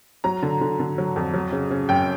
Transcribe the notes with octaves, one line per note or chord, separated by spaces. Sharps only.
F#3 A#5
D3
D3
D3
F#3
F2
F#3
C#3
C#3
F#2 G5